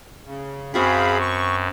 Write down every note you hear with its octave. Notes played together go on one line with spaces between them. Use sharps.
C#3
F#2 C4 F#4 G#4 F5 G5 B5
C#6